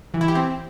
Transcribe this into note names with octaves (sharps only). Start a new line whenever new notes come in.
E3
E4
G4
C4